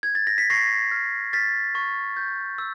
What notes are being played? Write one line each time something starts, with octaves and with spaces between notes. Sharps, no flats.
G#6
A6
A#6
B6
C#6 A#6 C7
F6
F6 A6 B6
C#6
G6
E6